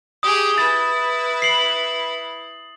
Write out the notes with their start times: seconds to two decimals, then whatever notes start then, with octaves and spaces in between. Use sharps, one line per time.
0.23 G4 G#4 D#6
0.58 E4 B4 A6
1.42 C7 F#7